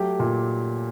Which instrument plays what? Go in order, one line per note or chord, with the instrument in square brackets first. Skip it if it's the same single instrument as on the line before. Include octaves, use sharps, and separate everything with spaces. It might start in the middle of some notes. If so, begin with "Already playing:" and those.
Already playing: [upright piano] F#3 A3 G4
A#2